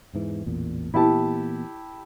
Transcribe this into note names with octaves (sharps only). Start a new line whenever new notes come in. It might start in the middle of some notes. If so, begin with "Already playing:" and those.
E2 G#2 E3
A1 E2 A#2
A#2 E3 B3 E4 G4 A5